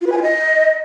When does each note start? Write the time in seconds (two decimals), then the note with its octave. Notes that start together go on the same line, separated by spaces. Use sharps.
0.01 F4
0.07 B4
0.12 G#5
0.17 F4
0.22 D#5